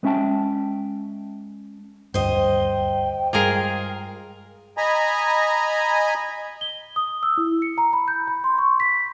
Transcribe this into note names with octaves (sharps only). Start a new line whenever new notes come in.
G#3 B3 C#4 E5 G5 A5
D#1 D2 G2 C5 D#5 G5
G2 G3 G#3 F4 G#4 A#4
D#5 G#5 A#5 B5
G7
D#6
E6
E4
C#7
A#5
B5
G6
B5
C6
C#6
B6